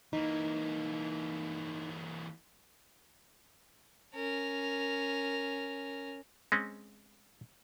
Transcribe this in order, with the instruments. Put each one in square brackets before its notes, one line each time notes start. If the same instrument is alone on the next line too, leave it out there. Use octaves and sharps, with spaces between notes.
[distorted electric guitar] E3 A#3 [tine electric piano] D#4
[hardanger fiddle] C#4 A#4
[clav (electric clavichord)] G#3 C4 C#4